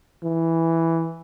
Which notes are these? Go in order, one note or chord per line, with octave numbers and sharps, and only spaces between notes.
E3